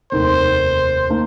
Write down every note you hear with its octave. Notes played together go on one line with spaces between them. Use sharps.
F1 D#2 D#3 C5
D#3 A#3